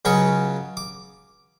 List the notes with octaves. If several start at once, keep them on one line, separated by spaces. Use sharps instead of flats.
C#2 C#3 F#3 C#4 C#6
D6